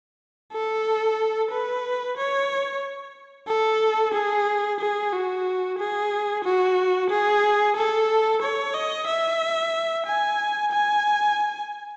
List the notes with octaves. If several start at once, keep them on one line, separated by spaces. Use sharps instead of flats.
A4
B4
C#5
A4
G#4
G#4
F#4
G#4
F#4
G#4
A4
C#5
D#5
E5
G#5
G#5